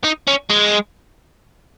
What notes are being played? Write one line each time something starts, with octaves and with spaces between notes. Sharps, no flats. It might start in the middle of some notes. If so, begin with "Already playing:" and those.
D#4
C#4
G#3